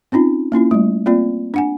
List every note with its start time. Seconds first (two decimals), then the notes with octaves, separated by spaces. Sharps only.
0.12 C4 C#4 D#4 F4
0.52 A#3 C#4 E4 F4
0.71 G3 A3
1.06 A#3 C4 F4 D5
1.54 D4 F#5 G#5